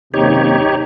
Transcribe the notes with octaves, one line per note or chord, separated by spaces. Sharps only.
F#1 D#2 C3 D#4 G4 C#5